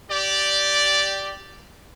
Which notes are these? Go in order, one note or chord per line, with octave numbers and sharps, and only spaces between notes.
G4 D5